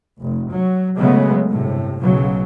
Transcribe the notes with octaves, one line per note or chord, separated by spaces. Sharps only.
F1
F#3
C#3 F#3 G#3 A3 B3
G1 A2 C3
B1 C#3 F#3